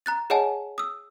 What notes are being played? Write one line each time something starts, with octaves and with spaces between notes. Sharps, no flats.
A#5 F#6 A6
G#4 C#5 D#5 F#5 G#5 A5
D#6 E6